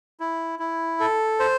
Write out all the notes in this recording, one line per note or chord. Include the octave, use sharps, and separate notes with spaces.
E4
E4
A4
C5